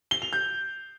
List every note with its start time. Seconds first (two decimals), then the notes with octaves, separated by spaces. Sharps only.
0.11 G7
0.22 F7
0.33 G6